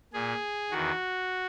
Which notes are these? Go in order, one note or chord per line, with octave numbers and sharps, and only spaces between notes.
A#2 G#4
E2 D#3 F#4